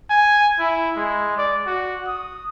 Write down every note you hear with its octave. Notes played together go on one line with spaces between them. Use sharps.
G#5
E4
G#3
D5
F#4
D#6